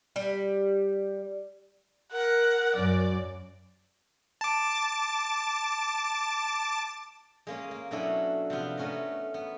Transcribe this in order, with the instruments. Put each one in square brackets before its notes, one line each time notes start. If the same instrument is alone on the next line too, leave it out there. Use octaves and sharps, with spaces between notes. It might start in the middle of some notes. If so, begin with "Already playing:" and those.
[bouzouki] G3
[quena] A#4 [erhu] F#5
[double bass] F#2 F#3 [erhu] D5
[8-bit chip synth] A5 D6
[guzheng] G#3 A#3 C#4
A#3
B2 F#3 A3 C#4 D4 E4
C3 F3 B3 F4
A3 B3 C#4 F#4 A#4
B3